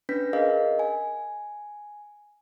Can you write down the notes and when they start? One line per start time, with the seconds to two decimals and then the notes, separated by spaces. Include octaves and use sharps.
0.09 C#4 D4 B4 G6 A#6 B6
0.33 G#4 A#4 D#5 F5
0.79 G#5